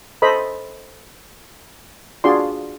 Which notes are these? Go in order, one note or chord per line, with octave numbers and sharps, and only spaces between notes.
A4 C5 D#5 B5
D4 F4 F#4 G#4 D5 C6